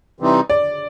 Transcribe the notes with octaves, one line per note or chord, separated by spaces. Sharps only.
C3 E3 G3 C4 D#4
D5